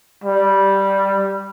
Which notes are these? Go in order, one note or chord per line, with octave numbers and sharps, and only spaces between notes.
G3